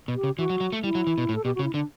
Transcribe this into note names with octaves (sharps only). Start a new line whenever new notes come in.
B2
G4
C#3
E3 F#4
F#3
F#3
A3
G3 E4
F#3
E3
B2
A2
A4
B2 G4
C#3 F#4
E4
D3 D4